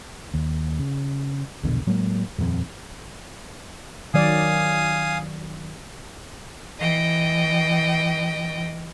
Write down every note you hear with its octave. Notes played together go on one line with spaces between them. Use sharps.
D#2
C#3
A#1 E2 B2 D3
A2 F#3 G#3 A#3
D#1 F2 G3 C4
D#3 F#3 D5 F5 G#5 D#6
E3 D#5 G5